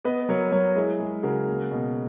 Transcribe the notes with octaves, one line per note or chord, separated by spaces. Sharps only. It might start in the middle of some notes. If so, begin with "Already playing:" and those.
B3 B4 D#5
F#3 A#4 C#5
F#3 A#4 C#5
G#3 E4 G#4
G#3
C#3 F#4 A#4
A#3
B2